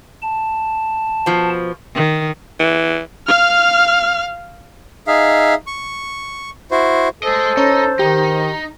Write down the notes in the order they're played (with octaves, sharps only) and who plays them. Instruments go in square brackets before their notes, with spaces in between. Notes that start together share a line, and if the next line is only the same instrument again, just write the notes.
[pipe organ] A5
[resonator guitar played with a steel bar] B2 F3
[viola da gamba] D#3
[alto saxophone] E3
[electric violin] F5 F6
[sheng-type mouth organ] D#4 G#4 E5 F5
C#6
E4 F#4 C5
[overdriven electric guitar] G#4 D#5 [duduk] A4 [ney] C5
[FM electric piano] C#4 C#5 [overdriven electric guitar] D#4
[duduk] D#3 [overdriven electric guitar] D#4 [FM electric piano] G4